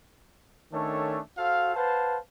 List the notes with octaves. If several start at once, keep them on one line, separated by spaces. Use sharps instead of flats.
D#3 A3 C#4 D4 A4 C#5
F#4 A4 C5 F5
B4 C5 F5 F#5 A5